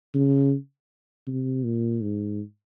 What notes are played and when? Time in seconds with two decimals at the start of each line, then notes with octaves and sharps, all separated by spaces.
0.14 C#3
1.27 C3
1.64 A#2
2.02 G#2